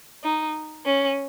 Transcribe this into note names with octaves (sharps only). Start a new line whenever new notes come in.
D#4
C#4